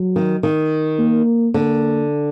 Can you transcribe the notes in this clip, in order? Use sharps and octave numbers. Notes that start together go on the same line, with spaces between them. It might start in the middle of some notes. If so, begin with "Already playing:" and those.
Already playing: F#3
D#3
D#3
A#3
D3 A#3